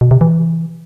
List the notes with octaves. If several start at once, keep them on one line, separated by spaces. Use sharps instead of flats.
B2
C3
E3